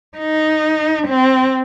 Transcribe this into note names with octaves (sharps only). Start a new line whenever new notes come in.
D#4
C4